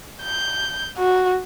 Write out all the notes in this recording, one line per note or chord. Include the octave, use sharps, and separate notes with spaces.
G6
F#4